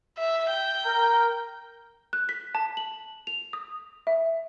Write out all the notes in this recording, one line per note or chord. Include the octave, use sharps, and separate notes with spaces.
E5
G5
A#4
F#6
B6
A5
F#7
F7
D#6
E5